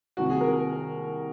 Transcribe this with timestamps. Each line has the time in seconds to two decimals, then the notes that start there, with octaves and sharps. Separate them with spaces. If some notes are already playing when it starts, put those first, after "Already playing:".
0.17 C2 C3 D#3 F#4
0.30 G#4
0.41 A#4